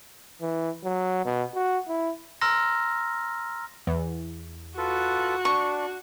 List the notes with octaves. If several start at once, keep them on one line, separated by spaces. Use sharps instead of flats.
E3
F#3
B2
F#4
E4
A#5 C6 E6 F6 A#6
E2
F4 F#4 A4 B4
D4 C#6